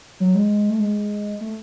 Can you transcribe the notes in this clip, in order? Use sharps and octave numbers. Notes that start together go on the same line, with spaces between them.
F#3
G#3
A3
G#3
A3